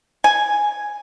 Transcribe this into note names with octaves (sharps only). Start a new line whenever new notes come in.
G#5